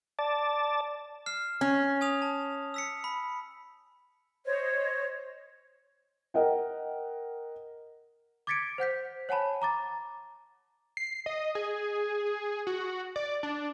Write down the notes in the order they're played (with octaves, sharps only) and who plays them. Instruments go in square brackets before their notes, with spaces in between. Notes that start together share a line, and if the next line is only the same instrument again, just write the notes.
[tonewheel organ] D5 A5
[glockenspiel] F6 C7 E7
[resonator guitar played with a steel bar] C#4
[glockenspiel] G#5 D#6 F7
A5
E6 B6 C#7
B5
[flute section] C5 C#5 D#5
[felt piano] A#4 D#5 F#5 G5
[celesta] D6 G#6 A6 B6 C#7 D7
C5 F#5 G6 B6
C#5 F#5 G#5 A5 B5
A#5 D6 A6
[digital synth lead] C7
D#5
G#4
F#4
D5
D4